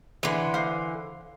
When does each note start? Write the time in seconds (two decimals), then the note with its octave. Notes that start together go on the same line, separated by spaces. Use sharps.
0.23 D3 E3 C6
0.54 C5 F5